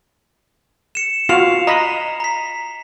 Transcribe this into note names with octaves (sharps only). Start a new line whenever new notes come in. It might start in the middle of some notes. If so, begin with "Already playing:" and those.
C#7 E7
F4 F#4 F5 C7 F7
D#5 A#5 B5
A#5 B6